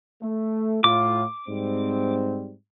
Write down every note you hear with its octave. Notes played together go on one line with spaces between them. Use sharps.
A3
A2 F4 D6
G#2 G3 C4